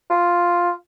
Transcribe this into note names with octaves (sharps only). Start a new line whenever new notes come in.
F4